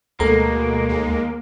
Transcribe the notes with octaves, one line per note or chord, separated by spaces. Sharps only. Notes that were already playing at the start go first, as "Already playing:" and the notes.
D2 B2 G#3 A#3 A4 A#5
D#2 G#3